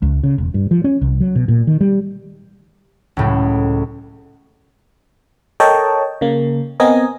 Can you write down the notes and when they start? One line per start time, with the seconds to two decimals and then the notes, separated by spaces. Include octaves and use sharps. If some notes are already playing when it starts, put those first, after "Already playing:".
0.02 C#2
0.23 C#3
0.38 E1
0.54 G2
0.71 F3
0.84 C#4
1.01 C2
1.21 F#3
1.36 B2
1.48 A#2
1.67 D#3
1.81 G3
3.17 C#2 A2 F#3
5.60 A4 A#4 C#5 D#5 G5 A5
6.21 C#3 A#3
6.80 B3 C4 A#4 D#5 G#5